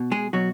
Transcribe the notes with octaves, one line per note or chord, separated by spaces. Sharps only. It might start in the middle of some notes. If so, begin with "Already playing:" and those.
Already playing: B2
G#3 G#4
B2 F#3 F#4